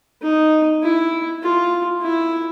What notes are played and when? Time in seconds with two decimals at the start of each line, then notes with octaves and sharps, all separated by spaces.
0.22 D#4
0.83 E4
1.43 F4
2.02 E4